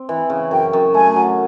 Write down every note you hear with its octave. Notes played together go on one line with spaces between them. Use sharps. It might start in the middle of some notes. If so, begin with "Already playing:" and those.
Already playing: C4
E3
C#3
F#2 G5
F#2
A3 G#5
F#3